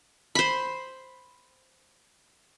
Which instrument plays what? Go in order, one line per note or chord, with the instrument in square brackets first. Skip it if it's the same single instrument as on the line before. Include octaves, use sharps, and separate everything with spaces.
[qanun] C5 B5